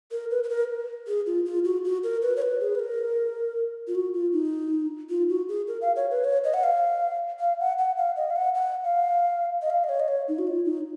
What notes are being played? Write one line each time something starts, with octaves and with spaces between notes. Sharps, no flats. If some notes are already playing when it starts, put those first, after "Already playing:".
A#4
B4
B4
A#4
G#4
F4
F4
F#4
F#4
A#4
B4
C#5
B4
G#4
B4
A#4
F4
F#4
F4
D#4
F4
F#4
G#4
A#4
F5
C#5
B4
C#5
D#5
F#5
F5
F5
F#5
F#5
F5
D#5
F5
F#5
F#5
F5
D#5
F5
D#5
C#5
D#5
C#5
D#4
F#4
F4
D#4